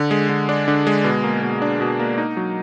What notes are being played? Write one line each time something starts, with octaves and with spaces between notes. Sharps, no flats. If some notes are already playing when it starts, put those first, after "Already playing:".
Already playing: D3
G#3
D3
D4
D3
G#3
B2
A#3
B2
D4
B2
A#3
D#4
F#3